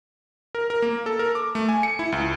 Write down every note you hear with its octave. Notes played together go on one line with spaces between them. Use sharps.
A#4
A#4
A#3
A4
A#4
D6
A3
G#5
C#7
E4
C#2